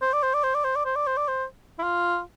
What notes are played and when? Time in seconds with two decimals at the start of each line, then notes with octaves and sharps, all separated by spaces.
0.02 C5
0.13 D5
0.23 C5
0.34 D5
0.43 C5
0.54 D5
0.64 C5
0.76 D5
0.85 C5
0.96 D5
1.07 C5
1.17 D5
1.28 C5
1.79 E4
1.83 F4